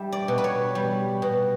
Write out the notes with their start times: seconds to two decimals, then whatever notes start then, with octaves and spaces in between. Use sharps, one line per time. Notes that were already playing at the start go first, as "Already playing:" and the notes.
Already playing: G3 E5
0.12 D5
0.28 B2
0.38 B4
0.44 C#5
0.75 G3
1.22 B2